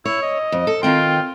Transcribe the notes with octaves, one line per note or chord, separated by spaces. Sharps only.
E4 C#5
D#5
F2
A4
D#3 C4 F4 G5